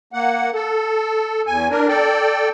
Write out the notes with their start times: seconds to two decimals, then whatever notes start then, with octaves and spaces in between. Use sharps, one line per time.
0.13 A#3 F#5
0.54 A4
1.47 E2 G#5
1.70 D4 A#4
1.88 A4 D5 G5